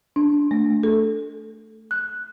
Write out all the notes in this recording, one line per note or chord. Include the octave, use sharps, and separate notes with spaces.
D4
A3
A4
F#6